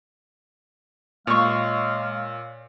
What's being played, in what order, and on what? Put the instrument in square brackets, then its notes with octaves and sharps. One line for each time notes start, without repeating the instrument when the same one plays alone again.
[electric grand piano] A#2 [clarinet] G#3 [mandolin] C#5 C#6 [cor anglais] F5